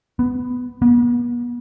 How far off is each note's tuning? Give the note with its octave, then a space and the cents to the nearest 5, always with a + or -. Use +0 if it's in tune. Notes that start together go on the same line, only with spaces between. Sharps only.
B3 +10
B3 -45